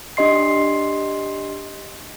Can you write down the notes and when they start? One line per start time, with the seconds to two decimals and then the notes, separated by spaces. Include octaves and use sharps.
0.17 D4 G4 D#5 C6 C7